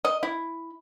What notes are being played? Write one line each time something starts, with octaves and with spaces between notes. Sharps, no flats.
D#5
E4